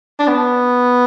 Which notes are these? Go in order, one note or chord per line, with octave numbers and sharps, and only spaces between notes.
D4
B3